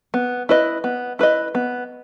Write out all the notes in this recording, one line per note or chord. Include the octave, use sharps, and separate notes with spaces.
B3
E4 B4 D#5
B3
E4 B4 D#5
B3